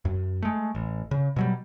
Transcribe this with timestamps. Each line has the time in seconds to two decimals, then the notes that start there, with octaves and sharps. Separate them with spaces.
0.05 F#2
0.42 G#3 A3
0.75 A1
1.11 C#3
1.36 B2 F#3 G3